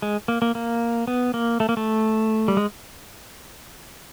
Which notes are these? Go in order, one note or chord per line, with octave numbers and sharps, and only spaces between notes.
G#3
A#3
A#3
A#3
B3
A#3
A3
A#3
A3
G3
G#3